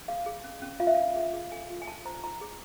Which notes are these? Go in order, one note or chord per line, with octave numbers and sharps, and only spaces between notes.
G#4 F5
G#4
C#4
C#4
F4 F5
E5
D4 F5
G#4
G#4
A4 G#5
F4
G#5
D4 A5
C5 A#5
D#4 A#5
G#4